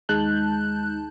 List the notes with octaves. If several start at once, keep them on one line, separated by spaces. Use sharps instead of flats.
D#2 G#3 D#4 A5 F#6 G6